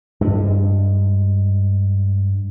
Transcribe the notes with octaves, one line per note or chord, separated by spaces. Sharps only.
G2 G#3